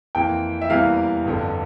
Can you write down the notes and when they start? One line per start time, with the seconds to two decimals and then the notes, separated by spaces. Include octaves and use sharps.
0.15 F2 E3 A#3 G5
0.61 E5
0.70 E2 C3 E3 G3 A#3 F5
1.25 G1 F2 D3